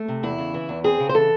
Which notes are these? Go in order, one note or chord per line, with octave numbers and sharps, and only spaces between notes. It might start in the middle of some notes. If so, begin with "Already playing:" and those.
Already playing: A3
C3
E2 E4
C#3
E3
E2
C4 G#4
C#3
C5
E3 A4